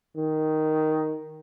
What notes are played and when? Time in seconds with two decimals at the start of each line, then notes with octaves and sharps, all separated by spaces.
0.17 D#3